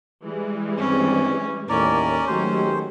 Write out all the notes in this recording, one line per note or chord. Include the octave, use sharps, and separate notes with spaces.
E3 G3 G#3
G2 D#3 C4 C#4
D#2 A2 C#4 A#4 D5
D#3 F#3 G#3 A3 G4 C5